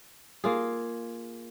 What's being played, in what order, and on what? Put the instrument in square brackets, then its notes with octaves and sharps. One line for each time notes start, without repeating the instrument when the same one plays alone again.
[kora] A#3 F4 G#4